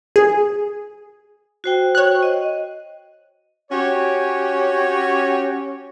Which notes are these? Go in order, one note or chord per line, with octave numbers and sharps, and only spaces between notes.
G#4
F#4 C5 G5
C#5 F#6
D#5
C#4 F#4 G4 C#5